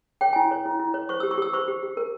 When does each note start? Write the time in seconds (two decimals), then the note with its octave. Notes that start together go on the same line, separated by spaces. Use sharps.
0.21 C#5 G5
0.33 E4 G#5
0.51 C#5
0.66 E4
0.79 E4
0.94 C#5
1.09 C5 C#6
1.20 G4 E6
1.31 C#6
1.38 G4 E6
1.53 C5 C#6
1.68 G4
1.83 G4
1.97 A#4